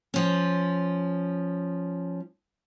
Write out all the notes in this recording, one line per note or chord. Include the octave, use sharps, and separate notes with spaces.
F3 C#4